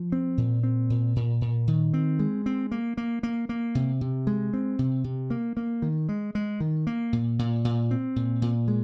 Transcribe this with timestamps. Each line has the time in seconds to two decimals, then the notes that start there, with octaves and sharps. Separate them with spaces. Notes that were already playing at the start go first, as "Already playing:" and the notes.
Already playing: F3
0.12 C4
0.38 A#2
0.63 C4
0.90 A#2
1.16 A#2
1.41 A#2
1.67 D#3
1.94 C4
2.19 G#3
2.46 C4
2.72 A#3
2.97 A#3
3.23 A#3
3.49 A#3
3.75 C3
4.01 C3
4.27 G#3
4.53 C4
4.79 C3
5.04 C3
5.30 A#3
5.57 A#3
5.82 D#3
6.09 G#3
6.35 G#3
6.60 D#3
6.87 A#3
7.13 A#2
7.39 A#2
7.65 A#2
7.91 C4
8.16 A#2
8.42 A#2
8.68 G#3